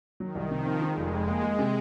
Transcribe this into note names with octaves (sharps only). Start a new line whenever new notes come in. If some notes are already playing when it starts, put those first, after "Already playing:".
D#3 F#3
C2
C3 F3
C4
D#3 G#3
F1
F2
A#3
G#3
C3